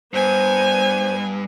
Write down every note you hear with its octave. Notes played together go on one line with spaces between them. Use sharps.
G2 B3 C5 G#5